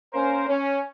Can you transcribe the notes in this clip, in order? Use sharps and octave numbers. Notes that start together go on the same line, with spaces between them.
A#3 C#4 A#4 C5
C#4